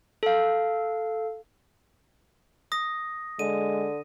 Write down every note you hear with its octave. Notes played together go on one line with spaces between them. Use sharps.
A4 F5
D#6 A#6
D3 G#3 D#7